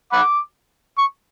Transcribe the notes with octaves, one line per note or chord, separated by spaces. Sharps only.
F#5 B5 D6
C#6